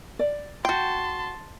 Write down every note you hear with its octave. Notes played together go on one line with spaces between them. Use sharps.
D5
F#4 G5 A5 C6